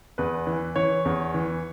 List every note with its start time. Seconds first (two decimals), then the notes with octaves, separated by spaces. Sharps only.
0.18 E2 B4
0.47 E3
0.76 E3 C#5
1.05 E2
1.34 E3